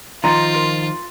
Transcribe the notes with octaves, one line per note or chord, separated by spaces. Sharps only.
D#3 F3 D#4 F4 A#5 C6 A6
A#4